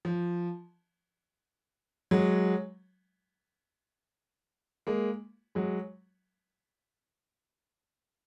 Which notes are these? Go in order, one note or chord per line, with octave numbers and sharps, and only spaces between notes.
F3
F#3 G#3
G#3 A#3
F#3 G#3